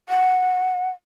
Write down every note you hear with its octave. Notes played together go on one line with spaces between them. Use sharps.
F#5